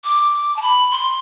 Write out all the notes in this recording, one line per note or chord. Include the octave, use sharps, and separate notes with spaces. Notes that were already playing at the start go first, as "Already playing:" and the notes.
D6
A5
B5
C6